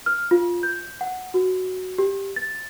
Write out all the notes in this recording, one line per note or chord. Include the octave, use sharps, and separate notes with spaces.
F6
F4
G6
F#5
F#4
G4
A6